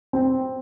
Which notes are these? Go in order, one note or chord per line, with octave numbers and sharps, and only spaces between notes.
C4